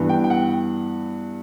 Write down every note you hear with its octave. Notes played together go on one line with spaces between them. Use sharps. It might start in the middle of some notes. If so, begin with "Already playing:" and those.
Already playing: G2 E3 B3
G5
G5
F#5